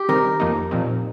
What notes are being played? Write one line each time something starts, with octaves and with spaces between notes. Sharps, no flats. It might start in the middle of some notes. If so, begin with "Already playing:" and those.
Already playing: G4
D#3 G3 C4 D#4 A#4
F2 F3 A#3 D#4
A#2 F3 C4 D#4